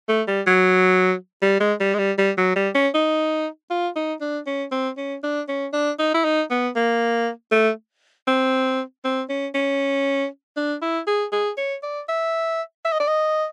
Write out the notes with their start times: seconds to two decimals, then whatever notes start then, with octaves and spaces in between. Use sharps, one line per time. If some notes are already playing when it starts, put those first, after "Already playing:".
0.09 A3
0.28 G3
0.47 F#3
1.42 G3
1.60 G#3
1.80 G3
1.94 G#3
1.98 G3
2.18 G3
2.37 F#3
2.56 G3
2.75 C#4
2.94 D#4
3.70 F4
3.96 D#4
4.21 D4
4.46 C#4
4.71 C4
4.97 C#4
5.23 D4
5.49 C#4
5.73 D4
5.99 D#4
6.14 E4
6.24 D#4
6.50 B3
6.76 A#3
7.52 A3
8.27 C4
9.04 C4
9.29 C#4
9.54 C#4
10.56 D4
10.82 E4
11.07 G#4
11.32 G#4
11.57 C#5
11.83 D5
12.09 E5
12.85 E5
12.93 D#5
13.00 D5
13.08 D#5